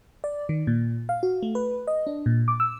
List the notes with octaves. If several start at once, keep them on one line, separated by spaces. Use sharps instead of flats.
D5
D#3
A#2
F5
F#4
A3
B4
D#5
D4
A#2
D6
E6